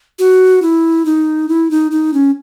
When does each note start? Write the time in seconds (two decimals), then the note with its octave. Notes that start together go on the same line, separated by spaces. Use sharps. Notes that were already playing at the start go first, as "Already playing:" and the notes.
0.19 F#4
0.62 E4
1.05 D#4
1.48 E4
1.71 D#4
1.91 D#4
2.14 C#4